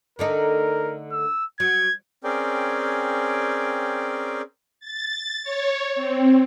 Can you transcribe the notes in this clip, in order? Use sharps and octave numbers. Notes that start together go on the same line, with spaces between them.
D3 A3 D#4 A#4
E6
F#3 G#6
C4 C#4 G#4 A#4 D5 G5
A6
C#5
C4